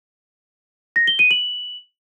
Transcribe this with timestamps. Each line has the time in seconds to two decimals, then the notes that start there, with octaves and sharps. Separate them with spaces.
0.96 A#6
1.07 G7
1.19 D#7
1.31 F#7